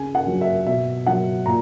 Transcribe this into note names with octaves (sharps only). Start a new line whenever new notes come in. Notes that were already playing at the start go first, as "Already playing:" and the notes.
Already playing: C#3 G#5
F#5
F#3
E5
B2 E5
F#3 F#5
A#2 A#5